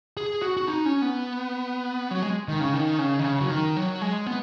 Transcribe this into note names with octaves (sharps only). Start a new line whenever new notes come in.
G#4
F#4
F#4
D#4
C#4
B3
F#3
G#3
D#3
C#3
D#3
C#3
D#3
C#3
F#3
D#3
F#3
G#3
B3